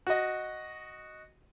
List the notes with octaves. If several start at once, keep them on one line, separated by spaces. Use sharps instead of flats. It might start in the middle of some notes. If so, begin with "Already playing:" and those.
F#4 D#5